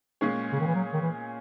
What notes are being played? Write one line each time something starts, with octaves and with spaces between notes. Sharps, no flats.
A#2 G#3 C#4 G#4 C#5
C#3
D#3
E3
F#3
D#3
E3